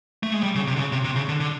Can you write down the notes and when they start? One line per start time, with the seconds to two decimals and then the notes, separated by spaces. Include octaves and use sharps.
0.23 A3
0.33 G#3
0.43 G3
0.55 C#3
0.67 C3
0.76 D3
0.80 C#3
0.92 C3
1.05 C3
1.16 C#3
1.28 D3
1.40 D3